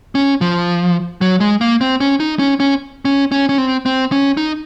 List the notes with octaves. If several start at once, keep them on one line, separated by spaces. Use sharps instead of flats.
C#4
F3
F#3
G#3
A#3
C4
C#4
D#4
C#4
C#4
C#4
C#4
C#4
C4
C4
C#4
D#4